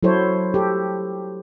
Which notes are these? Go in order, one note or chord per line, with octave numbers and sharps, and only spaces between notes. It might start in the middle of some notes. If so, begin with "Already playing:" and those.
F#3 E4 A4 C5 C#5
G4 A4